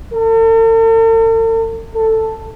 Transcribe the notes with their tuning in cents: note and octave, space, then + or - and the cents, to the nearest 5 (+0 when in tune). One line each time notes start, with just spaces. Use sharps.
A4 +45
A4 +10